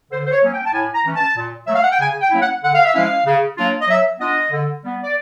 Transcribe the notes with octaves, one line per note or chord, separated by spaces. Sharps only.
D3 C5
C5
C#5
F#3 A#3 C#4
G5
A5
A2 G#5
A#5
E3 A3 C#4
A5
A#2
F#3 A3 E5
F5
F#5
G5
C#3 G#5
G5
F#3 A#3 C#4 E4
F#5
D3 F#5
F5
E5
F3 G#3 C#4 E4 F5
C#3
F#3 A#3 D4 F4
D#5
F#3 E5
B3 D4 F4 D#5
D3
G3 B3
D5